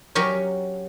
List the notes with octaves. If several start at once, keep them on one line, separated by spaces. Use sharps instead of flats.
F#3 C#4 G4 A#4 C#5